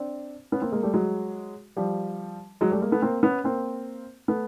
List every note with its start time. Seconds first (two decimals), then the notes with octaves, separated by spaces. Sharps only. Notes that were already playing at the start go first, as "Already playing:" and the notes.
Already playing: C4 D4
0.52 B3 C#4
0.62 A#3 C4
0.72 G#3 A#3
0.83 G3 A3
0.94 F#3 G#3
1.77 F3 G3
2.61 F#3 G#3
2.72 G3 A3
2.82 G#3 A#3
2.92 A3 B3
3.02 A#3 C4
3.23 B3 C#4
3.44 A#3 C4
4.28 A3 B3